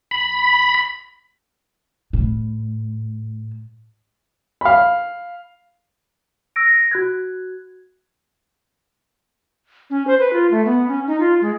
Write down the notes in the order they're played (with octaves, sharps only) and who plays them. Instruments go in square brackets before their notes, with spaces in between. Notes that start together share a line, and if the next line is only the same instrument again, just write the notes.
[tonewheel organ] B5
[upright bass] A2
[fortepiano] F5 B5
[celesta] E6 A#6 D7
F#4 F#6 G#6
[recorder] C#4
C5
B4
F4
A3
B3
C#4
D#4
F4
G#3